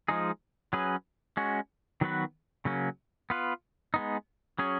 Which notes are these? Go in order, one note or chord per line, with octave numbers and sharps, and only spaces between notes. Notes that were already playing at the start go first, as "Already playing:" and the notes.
F3 G#3 D#4 G#4
F#3 C#4 G#4 B4
G#3 C#4 F#4
D#3 F#3 B3 F#4 B4
C#3 F#3 A#3 C#4
B3 F4 B4
G#3 B3 D#4
F#3 C#4 G#4 C#5